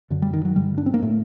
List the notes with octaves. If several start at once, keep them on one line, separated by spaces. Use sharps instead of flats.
F#2 D3
G3
D#3
F#3
G2 D3 G3
D4
C4
A#3
A2 A3